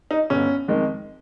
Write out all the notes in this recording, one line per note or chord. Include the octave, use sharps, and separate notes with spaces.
D#4
G1 C#4
F2 D#3 G#3